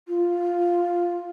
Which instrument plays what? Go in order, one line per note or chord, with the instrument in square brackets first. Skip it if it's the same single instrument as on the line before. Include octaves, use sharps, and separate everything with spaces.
[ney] F4